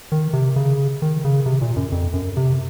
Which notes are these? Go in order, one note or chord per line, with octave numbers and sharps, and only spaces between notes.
D#3
C3
C#3
D#3
C#3
C3
A#2
F#2
F2
F#2
C3